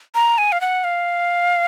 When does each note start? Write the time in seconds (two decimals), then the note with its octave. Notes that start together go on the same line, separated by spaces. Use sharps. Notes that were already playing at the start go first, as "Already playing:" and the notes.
0.15 A#5
0.38 G#5
0.52 F5
0.61 F#5
0.84 F5